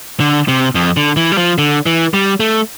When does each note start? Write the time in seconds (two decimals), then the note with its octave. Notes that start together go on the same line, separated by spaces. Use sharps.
0.20 D3
0.48 C3
0.75 F2
0.97 D3
1.17 E3
1.32 G3
1.38 F3
1.58 D3
1.86 E3
2.14 G3
2.40 A3